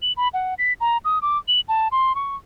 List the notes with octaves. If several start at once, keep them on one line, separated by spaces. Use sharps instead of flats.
F#7
B5
F#5
B6
A#5
D#6
D6
F#7
A5
C6
C#6